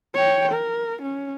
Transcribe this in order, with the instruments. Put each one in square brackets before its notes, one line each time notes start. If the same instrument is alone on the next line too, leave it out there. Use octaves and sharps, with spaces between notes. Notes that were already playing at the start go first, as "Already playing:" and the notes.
[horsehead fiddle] C#5 G5
A#4
C#4